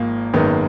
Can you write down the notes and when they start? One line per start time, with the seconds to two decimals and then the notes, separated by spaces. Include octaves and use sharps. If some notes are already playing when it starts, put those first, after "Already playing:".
Already playing: G#1 G#2 F3 A#3
0.34 G#1 F#2 D#3 G#3 B3